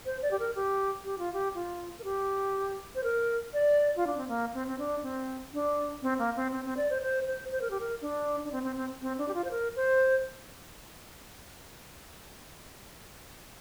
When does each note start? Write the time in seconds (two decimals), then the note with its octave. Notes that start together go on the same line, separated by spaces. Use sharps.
0.06 C5
0.22 D5
0.31 G4
0.39 A#4
0.56 G4
1.05 G4
1.18 F4
1.33 G4
1.55 F4
1.99 A#4
2.04 G4
2.95 C5
3.04 A#4
3.53 D5
3.96 F4
4.07 D4
4.17 C4
4.28 A#3
4.54 C4
4.68 C4
4.78 D4
5.03 C4
5.53 D4
6.02 C4
6.19 A#3
6.36 C4
6.52 C4
6.65 C4
6.77 D5
6.90 C5
7.02 C5
7.27 C5
7.52 C5
7.61 A#4
7.71 G4
7.80 A#4
8.01 D4
8.44 D4
8.52 C4
8.63 C4
8.76 C4
9.01 C4
9.18 D4
9.28 G4
9.34 F4
9.44 C5
9.51 A#4
9.76 C5